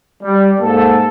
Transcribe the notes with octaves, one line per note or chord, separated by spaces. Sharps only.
G3
G#2 A#3 A4